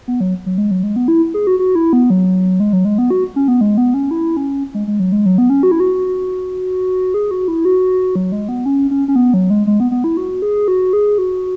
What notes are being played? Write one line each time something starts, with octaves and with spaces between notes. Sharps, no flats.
B3
F#3
F#3
G#3
F#3
G#3
B3
E4
G#4
F#4
F#4
E4
B3
F#3
G#3
F#3
G#3
B3
F#4
C#4
B3
G#3
B3
C#4
E4
C#4
G#3
G#3
F#3
G#3
F#3
B3
C#4
F#4
E4
F#4
G#4
F#4
E4
F#4
F#3
G#3
B3
C#4
C#4
C#4
B3
F#3
G#3
G#3
B3
B3
E4
F#4
G#4
F#4
G#4
F#4